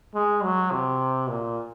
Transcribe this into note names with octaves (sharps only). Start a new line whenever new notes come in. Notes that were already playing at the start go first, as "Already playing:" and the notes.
G#3
F#3
C3
A#2